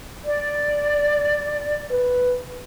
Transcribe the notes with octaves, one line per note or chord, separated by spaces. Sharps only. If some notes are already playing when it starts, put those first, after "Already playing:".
D5
B4